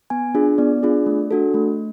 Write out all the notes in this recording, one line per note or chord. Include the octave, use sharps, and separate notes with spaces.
B3 G#5
D4 F4 G#4
B3 D5
D4 F4 G#4
A3
D4 F#4 A4
A3